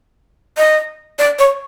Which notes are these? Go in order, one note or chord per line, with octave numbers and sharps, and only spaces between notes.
D#5
D5
C#5